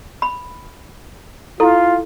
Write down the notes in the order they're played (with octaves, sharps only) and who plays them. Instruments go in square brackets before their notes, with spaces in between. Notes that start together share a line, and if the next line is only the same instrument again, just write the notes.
[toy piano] B5
[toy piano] E4 A4 [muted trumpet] F4